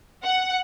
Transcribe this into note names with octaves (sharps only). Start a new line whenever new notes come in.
F#5